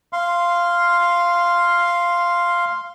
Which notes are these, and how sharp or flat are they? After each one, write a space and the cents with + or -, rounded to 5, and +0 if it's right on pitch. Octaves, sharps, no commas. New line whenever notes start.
F5 -10 C6 +0